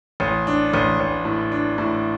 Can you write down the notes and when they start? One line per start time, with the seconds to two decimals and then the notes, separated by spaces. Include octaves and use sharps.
0.20 A1
0.47 D4
0.74 A1
1.00 A1
1.25 A2
1.52 D4
1.78 A2